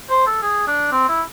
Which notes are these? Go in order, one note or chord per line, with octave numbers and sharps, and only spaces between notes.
C5
A4
G#4
D4
C4
E4